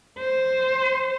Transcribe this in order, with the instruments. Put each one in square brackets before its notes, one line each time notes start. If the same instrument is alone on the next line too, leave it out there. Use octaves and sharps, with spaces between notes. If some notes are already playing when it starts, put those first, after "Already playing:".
[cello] C5